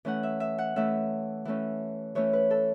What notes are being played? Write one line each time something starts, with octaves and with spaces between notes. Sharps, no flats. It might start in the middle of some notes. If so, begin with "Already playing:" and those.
E3 A3 C#4 F#5
E5
E5
F#5
E3 A3 C#4 E5
E3 A3 C#4
E3 A3 C#4 C#5
B4
A4